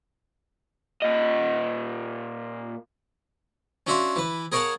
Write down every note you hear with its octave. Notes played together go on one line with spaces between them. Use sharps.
A#2 D#5
C#4 D4 F#4 E5 F5 C6
E3 B4
G#4 A#4 C#5 F5 F#5 A5